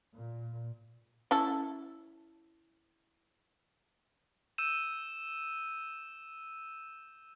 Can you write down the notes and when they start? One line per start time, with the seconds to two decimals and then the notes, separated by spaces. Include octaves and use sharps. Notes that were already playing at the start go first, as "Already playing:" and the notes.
0.15 A#2
1.31 C#4 E4 A4
4.58 E6 G6 D#7 E7